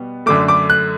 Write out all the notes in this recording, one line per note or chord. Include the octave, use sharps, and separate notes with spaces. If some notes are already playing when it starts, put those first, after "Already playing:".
Already playing: B2 G3 B3
F#2 D3 A3 D6
D6
F#6